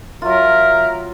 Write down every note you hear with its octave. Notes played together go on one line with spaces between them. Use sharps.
F#3 F4 A#4 E5